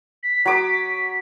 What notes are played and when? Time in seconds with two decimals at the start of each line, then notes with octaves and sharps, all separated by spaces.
0.23 B6
0.46 F#3 D6 D#6